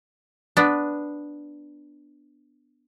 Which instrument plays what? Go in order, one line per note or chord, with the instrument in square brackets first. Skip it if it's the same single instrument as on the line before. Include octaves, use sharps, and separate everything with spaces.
[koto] B3 D4